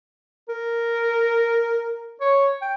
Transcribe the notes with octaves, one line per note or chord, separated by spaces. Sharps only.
A#4
C#5
G5